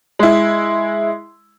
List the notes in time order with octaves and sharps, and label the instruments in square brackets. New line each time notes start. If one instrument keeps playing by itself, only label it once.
[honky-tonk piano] G#3 E4